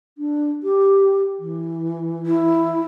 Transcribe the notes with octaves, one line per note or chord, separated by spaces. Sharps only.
D4
G4
E3
E4